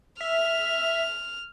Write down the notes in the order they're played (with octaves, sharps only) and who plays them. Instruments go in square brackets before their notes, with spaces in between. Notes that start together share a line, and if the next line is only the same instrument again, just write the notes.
[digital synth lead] E5 [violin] F6